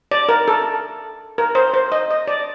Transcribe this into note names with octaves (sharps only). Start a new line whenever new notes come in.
D5
A#4
A4
A#4
C5
C5
D#5
D#5
D5